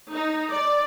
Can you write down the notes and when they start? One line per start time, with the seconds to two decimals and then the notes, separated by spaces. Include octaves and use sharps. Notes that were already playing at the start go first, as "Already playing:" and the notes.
0.12 D#4
0.52 D5